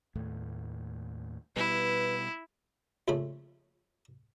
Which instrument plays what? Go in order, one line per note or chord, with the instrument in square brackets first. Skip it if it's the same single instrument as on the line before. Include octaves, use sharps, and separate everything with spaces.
[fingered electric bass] D#2 A2 A3
[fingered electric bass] B2 G3 [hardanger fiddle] E4 [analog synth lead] B4
[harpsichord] A#1 F2 C#3 A3 B5